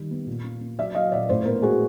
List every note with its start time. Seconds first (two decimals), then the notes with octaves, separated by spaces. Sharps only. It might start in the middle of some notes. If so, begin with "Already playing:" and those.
Already playing: D#3 G3
0.11 B3
0.27 A#2
0.44 A#3
0.61 A#3
0.79 F#3 D5 E5
0.95 F#3 D#5 F5
1.12 A#2 D5 E5
1.29 A2 C5 D5
1.45 B3 A#4 C5
1.62 G#3 F#4 G#4